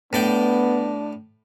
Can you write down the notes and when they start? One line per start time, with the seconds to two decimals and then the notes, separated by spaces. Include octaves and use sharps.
0.13 A2 B3 D4 D5 G5